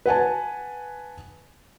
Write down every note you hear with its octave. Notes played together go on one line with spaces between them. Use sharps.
B4 F#5 G#5 A5